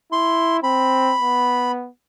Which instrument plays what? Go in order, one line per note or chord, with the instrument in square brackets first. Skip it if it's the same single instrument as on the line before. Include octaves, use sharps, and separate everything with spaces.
[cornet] E4 [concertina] C6
[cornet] C4 [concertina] B5
[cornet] B3